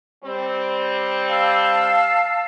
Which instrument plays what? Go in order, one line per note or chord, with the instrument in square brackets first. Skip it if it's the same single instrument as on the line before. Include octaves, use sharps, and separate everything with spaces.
[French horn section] G3 C4
[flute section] F5 A5 E6